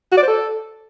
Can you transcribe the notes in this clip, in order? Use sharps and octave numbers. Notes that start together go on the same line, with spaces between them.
F#4
D5
C5
A4